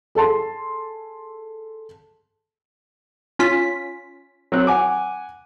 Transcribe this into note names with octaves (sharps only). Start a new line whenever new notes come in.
G#4 A4 A5 C6
C#4 F4 B6
F#3 C4 F#6
F#5 G#5 D6